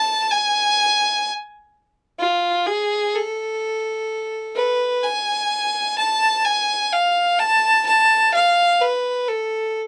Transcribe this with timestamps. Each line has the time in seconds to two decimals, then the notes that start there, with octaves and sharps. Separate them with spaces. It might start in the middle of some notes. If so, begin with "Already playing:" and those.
Already playing: A5
0.31 G#5
2.20 F4
2.67 G#4
3.15 A4
4.55 B4
5.03 G#5
5.98 A5
6.45 G#5
6.93 F5
7.39 A5
7.87 A5
8.34 F5
8.81 B4
9.29 A4